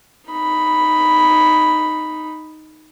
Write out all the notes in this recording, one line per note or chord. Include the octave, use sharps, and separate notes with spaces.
D#4 B5